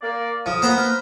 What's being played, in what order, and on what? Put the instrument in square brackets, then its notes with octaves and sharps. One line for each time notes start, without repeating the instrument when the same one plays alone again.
[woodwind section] A#3 D5
[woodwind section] F2 D#6 [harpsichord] F3
[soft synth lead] A#3 [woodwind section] B3 [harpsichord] C5 A#5 B5
[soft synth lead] F6